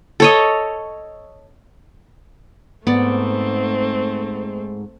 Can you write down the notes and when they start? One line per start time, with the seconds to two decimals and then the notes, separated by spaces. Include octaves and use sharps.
0.20 A4 C#5 D#5
2.87 G#2 A3 B3 C4 D5